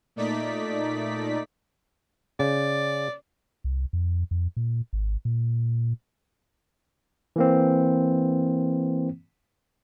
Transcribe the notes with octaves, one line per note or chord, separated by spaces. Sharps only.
A#2 A3 D#4 D5 B6
C#3 D5
C2
F2
F2
A#2
G#1
A#2
E3 A#3 C4